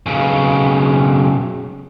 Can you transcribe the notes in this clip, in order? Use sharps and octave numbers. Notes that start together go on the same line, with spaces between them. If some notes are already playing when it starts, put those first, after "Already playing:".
B1 C#3